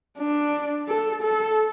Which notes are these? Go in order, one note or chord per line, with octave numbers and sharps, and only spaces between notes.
D4
A4
A4